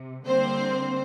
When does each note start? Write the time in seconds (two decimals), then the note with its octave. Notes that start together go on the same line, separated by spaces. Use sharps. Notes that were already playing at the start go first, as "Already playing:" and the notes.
Already playing: C3
0.25 D3 G3 A#3 C4 C5